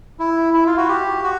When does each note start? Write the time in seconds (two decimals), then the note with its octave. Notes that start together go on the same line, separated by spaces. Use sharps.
0.19 E4
0.54 E4
0.66 F4
0.77 F#4
0.88 G4
1.24 F#4